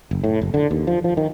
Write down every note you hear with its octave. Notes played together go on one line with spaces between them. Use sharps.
F#1
A2
F#1
D3
D#2
F3
F3
D#3